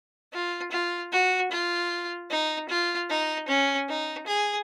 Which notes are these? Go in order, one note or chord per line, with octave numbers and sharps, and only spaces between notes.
F4
F4
F#4
F4
D#4
F4
D#4
C#4
D#4
G#4